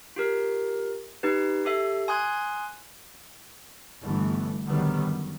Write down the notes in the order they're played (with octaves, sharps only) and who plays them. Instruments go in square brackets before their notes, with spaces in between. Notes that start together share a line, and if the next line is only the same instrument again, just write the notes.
[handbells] F4 G4 A#4
D#4 G4 B4
G4 A4 E5
G#5 C6 D#6 F#6 G#6
[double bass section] G1 E3 A3 B3
A#1 D3 D#3 F#3 G3 B3
F#2